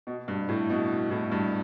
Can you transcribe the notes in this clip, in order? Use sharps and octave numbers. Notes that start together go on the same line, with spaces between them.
B2
G2
A2
B2
A2
G2